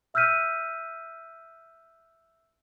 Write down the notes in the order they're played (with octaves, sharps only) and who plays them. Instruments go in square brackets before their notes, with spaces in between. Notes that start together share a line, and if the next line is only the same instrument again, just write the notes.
[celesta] E5 E6 F6 G6 B6 D#7